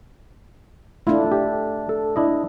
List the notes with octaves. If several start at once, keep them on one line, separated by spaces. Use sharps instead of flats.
A3 D4 E4 F4
G4
A4
D4 E4 D#5